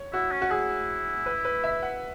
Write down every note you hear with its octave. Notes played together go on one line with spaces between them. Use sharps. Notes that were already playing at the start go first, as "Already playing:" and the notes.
Already playing: C#5
E4 F#4
C#4
F#4
E4 G#4
B4
B4
E5
F#5